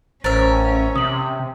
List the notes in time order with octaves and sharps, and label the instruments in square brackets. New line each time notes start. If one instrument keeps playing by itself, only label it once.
[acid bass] A1 [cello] C#4 [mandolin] A#4 E5 [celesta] C5 A6
[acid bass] C3 [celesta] D#6 F#7